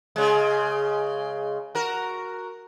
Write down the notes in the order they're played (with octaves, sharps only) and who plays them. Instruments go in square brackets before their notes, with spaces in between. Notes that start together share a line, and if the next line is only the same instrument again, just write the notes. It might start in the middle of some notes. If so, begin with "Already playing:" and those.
[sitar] C#3 G#3
F#4 A#4